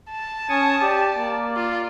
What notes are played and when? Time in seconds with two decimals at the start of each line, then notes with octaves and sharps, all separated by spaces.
0.11 A5
0.49 C#4 G#5 C#6 D#6
0.82 G4 D5
1.17 A#3
1.56 F4